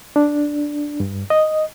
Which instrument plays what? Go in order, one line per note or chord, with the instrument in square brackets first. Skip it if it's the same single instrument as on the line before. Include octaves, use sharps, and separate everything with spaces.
[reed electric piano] D4
G2
D#5